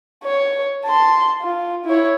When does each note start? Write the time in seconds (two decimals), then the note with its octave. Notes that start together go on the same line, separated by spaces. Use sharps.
0.24 C#5
0.85 A5 C6
1.41 F4
1.85 E4 C#5